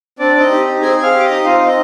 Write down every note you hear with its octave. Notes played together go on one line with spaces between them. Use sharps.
C4 D4 D5
C4 D#4 D#5
G4
D#4
C4 G#4 G#5
C4
F5 F6
G4
D6
D#5 D#6
D#4
C4 F4 F5
C4
D#4 D#5